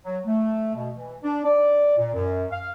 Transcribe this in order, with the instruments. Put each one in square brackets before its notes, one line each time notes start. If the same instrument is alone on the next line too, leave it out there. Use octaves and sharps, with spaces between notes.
[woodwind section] F#3
A3
B2
E3
D4
D5
A#2
F#2
F5